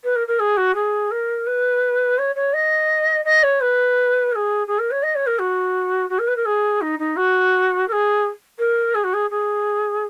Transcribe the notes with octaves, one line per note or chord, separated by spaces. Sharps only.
B4
A#4
A#4
G#4
F#4
G#4
A#4
B4
C#5
C#5
D#5
D#5
C#5
B4
A#4
G#4
G#4
A#4
C#5
D#5
C#5
A#4
F#4
F#4
A#4
B4
A#4
G#4
D#4
D#4
F#4
A#4
G#4
A#4
G#4
F#4
G#4
G#4